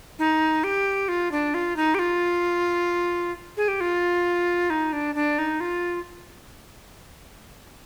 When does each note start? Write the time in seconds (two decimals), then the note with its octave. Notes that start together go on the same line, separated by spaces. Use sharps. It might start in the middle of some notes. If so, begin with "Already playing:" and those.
0.19 D#4
0.64 G4
1.08 F4
1.32 D4
1.54 F4
1.76 D#4
1.95 G4
1.99 F4
3.57 G#4
3.68 G4
3.81 F4
4.70 D#4
4.93 D4
5.15 D4
5.38 D#4
5.60 F4